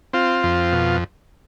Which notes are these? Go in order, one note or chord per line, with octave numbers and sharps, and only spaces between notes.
C4 F4
F2
B2